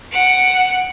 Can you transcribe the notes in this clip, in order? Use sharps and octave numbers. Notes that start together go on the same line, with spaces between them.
F#5 D7